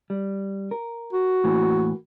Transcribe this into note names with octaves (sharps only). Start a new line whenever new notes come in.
G3
A#4
F#4
A2 E3 A#3